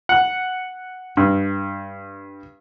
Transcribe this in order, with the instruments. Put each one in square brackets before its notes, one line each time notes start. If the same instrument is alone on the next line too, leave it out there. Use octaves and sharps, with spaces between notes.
[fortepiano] F#5
G2